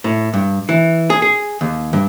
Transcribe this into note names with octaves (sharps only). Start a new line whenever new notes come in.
A2
G2
E3
G#4
G#4
D#2
G2